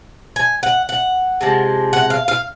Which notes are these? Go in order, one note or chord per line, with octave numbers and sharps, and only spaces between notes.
G#5
F#5
F#5
C3 F3 G#3
F#5
F5
F5